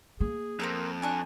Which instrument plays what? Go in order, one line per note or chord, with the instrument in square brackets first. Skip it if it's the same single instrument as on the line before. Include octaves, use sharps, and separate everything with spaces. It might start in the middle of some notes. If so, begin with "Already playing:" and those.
[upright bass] A#3 [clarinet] G#4
[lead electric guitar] F2 [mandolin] C4 A#4 G6
[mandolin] D4 C#6 F#6 [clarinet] G#5